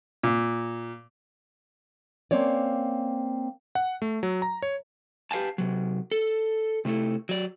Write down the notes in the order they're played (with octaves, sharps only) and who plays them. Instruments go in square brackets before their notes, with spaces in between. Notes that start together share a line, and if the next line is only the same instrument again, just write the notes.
[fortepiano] A#2
[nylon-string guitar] A#3 C4 C#4 C#5 D5
[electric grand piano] F#5
A3
F#3
A#5
C#5
[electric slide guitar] G4 B4 F5 G#5 A5
C3 F#3
A4
C3 A3 E4 A4
F#3 D5